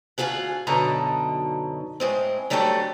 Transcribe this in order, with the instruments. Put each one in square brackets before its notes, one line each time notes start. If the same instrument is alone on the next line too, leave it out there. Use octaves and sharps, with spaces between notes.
[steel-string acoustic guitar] D2 G2 F4 G#4 F#5
F#2 B2 D3 D#4 A5 A#5
A2 G#3 C4
F#3 G3 A3 C4 D4 A4